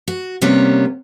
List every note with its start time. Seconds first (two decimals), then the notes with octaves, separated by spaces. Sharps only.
0.08 F#4
0.42 C3 G3 A#3 B3 C#4 C#5